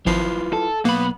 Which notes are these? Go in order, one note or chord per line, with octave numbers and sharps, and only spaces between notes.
G#1 F3 E4 F4 B4 C7
A4
B1 A#3 B3 B5